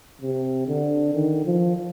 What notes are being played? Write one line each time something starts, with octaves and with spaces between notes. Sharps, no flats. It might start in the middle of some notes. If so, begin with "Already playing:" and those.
C3
D3
D#3
F3